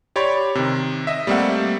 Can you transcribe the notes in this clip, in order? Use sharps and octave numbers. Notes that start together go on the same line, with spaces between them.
G4 C#5 D5 B5 C6
C3 D#3
D#5 E5
G3 A3 A#3 C4 E5 F#5